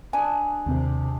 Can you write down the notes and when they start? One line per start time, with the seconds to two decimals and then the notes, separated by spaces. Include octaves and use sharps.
0.13 D4 G#4 G#5
0.66 D#2 C3 C4